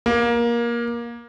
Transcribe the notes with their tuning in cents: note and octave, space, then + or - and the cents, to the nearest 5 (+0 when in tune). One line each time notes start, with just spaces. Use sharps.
A#3 +20